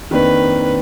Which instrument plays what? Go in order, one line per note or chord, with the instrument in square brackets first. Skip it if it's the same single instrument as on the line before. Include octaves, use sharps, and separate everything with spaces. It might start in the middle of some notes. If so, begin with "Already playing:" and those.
[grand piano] F2 D#3 A#3 D4 [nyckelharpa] B4